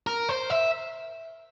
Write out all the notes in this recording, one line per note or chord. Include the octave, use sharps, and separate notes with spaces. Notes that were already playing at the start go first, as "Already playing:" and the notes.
A#4
C5
E5